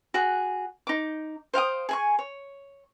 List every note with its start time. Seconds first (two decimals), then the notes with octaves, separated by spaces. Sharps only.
0.14 F#4 G#4
0.87 D#4 D6
1.54 C5 F5 G5 D#6
1.89 G#4 G#5 C#6
2.19 C#5